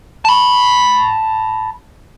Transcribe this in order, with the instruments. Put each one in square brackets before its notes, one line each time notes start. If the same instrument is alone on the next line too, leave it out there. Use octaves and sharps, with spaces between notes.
[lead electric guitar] A5 B5